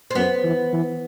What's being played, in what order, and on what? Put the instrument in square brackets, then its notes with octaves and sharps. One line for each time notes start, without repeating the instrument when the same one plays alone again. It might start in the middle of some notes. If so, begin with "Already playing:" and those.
[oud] C4
[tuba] F#2 [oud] B3
[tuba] E3
E3